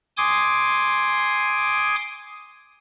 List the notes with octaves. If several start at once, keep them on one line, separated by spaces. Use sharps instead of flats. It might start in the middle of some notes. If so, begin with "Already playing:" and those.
G#5 C6 D6 D#6